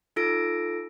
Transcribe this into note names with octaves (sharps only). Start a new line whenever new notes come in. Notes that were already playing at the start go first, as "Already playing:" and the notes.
D#4 F4 A4 E6 A#6 D7